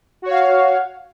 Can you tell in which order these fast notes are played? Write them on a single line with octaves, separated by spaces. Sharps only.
F#4 C#5 F5